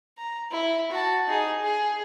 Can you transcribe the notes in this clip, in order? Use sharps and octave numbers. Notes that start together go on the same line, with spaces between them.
A#5
E4
F#4 A5
D#4 G#4
G#4